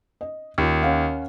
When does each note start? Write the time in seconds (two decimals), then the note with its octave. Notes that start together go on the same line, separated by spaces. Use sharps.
0.21 D#5
0.58 D#2 C#4 F4
0.82 C#4 F5 F#5